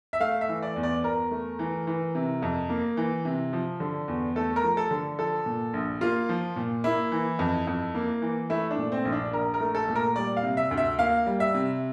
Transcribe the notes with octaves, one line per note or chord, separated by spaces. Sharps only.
E5
A3 F5
E5
E3
D5
E2
D5
E2 A#4
A3
E3
E3
C3
F2
A#3
E3
C3
F3
D3
E2
A3 A4
A#4
F3
A4
D3
F3 A4
A#2
A#1
A#3 F4
F3
A#2
A#3 E4
E3
F2
F2
A#3
E3
A3 E4
D4
A#2
C4
A#1
D4
A#1 A#4
A#4
A3
A4
A#2
A#4
G3 D5
F5
C3
E5
D2
E5
A#3 F5
G3
E5
C3